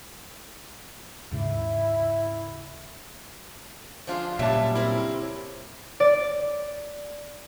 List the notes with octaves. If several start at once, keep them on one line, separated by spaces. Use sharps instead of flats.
D#2 G#2 C#3 E4
F3 D4 F4 G#4
A#2 C#3 F#3 G3 E5 A5
C4 E4 A#4
D5